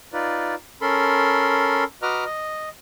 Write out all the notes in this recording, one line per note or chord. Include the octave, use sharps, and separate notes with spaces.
D#4 F4 B4 D5
C#4 A4 A#4 B5 C6
F#4 B4 D#5 A#5 D6 F6
D#5